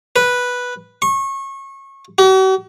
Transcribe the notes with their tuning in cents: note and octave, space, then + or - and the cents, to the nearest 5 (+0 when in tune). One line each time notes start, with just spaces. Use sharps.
B4 -5
C#6 -25
F#4 +45